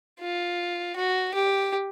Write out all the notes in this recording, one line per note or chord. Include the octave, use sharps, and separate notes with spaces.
F4
F#4
G4